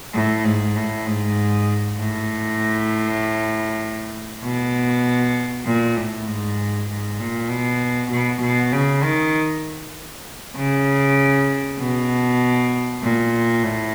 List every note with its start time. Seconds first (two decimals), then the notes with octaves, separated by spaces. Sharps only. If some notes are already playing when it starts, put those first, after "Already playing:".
0.14 A2
0.44 G#2
0.76 A2
1.07 G#2
1.98 A2
4.43 B2
5.66 A#2
5.96 A2
6.27 G#2
6.89 G#2
7.19 A#2
7.49 B2
8.11 B2
8.41 B2
8.72 C#3
9.03 D#3
10.56 C#3
11.78 B2
13.02 A#2
13.63 A2